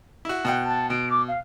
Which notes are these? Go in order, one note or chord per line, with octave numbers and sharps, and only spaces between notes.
E4 F#4
B2 F#5 G5
A5
B2 D7
D6
F5